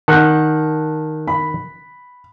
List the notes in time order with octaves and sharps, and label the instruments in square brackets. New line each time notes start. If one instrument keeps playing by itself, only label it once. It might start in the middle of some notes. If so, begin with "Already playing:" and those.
[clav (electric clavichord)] D#3 F#5 [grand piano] A5 F#6 G6
[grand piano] B5